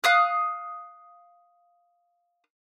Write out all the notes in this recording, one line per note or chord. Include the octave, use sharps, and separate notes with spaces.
F5 D#6 F#6